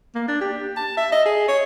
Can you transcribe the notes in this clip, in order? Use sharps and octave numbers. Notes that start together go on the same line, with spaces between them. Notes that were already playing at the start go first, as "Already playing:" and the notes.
A#3
D4
G4
A5
E5
D#5
G#4
C#5